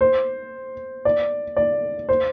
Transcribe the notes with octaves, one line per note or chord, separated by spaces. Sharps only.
C5
D5
D5
C5